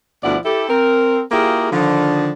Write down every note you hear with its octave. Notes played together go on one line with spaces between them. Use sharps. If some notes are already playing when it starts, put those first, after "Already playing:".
D2 B2 F3 E4 D5 F#5
E4 G4 A4
C4 A#4
A#3 E4 F4 G4 G#4
D3 D#3 F3